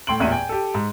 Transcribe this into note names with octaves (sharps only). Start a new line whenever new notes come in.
A2 G5 C6 D7 F#7
A1 E2 A#2 E5 D#7
G5 G#5
G4 A4
G#2